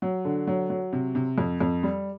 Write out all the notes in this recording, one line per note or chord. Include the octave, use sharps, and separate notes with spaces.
F#3
D3
F#3
F#3
C3
C3
F2
F2
G3